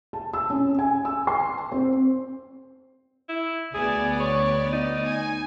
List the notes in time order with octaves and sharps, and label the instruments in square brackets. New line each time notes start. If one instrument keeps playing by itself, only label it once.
[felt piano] A5
E6
C#4
G#5
E6
C6
C4
[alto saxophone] E4
[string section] D2 B3 D5 [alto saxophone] G#4
[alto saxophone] C#5
D#4
[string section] G#5